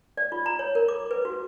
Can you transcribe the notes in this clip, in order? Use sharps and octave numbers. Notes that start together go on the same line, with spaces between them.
D5
F4
A#5
C#5
A#4
D6
B4
F#4